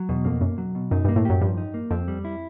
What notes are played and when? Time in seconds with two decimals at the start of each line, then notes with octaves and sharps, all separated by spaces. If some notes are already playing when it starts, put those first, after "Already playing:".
Already playing: F#3
0.09 E2 B2
0.24 F2 A#3
0.41 B1 F#2
0.58 F#3
0.75 B2
0.91 F#2 D#4
1.05 G2 A#3
1.16 A2
1.25 F#2 G4
1.41 G2 F3
1.57 D#4
1.74 A#3
1.91 F2 C4
2.08 G3
2.25 E4